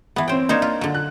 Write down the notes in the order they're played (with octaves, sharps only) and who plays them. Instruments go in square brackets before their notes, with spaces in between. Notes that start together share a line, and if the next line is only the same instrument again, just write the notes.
[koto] E3 B3
[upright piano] C4 C#5 [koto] C5 G5
[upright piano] A#3 D4 [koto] D#4 C5 C#5
[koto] F4
D3 F#3
[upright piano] F#6